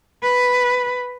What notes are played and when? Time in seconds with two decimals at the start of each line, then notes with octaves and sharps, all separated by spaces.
0.23 B4